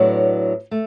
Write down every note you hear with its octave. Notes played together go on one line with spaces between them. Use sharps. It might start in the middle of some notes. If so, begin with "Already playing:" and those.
Already playing: A2 F#3 B3 D4
A3